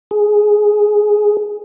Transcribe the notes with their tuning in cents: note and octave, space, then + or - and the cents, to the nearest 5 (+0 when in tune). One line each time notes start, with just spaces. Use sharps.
G#4 +10